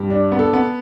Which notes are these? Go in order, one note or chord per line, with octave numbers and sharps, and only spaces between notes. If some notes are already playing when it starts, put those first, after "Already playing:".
Already playing: G2
D4
B3
A4
B3